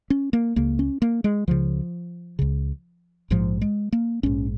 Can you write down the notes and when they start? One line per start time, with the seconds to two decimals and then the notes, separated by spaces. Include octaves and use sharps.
0.10 C#4
0.33 A#3
0.56 C#2 C#3 A#3
0.79 C#4
1.02 A#3
1.24 G#3
1.47 C#2 C#3 F3
2.39 C#2 C#3
3.30 A#1 G#2 F3
3.62 G#3
3.93 A#3
4.23 A#1 G#2 C#4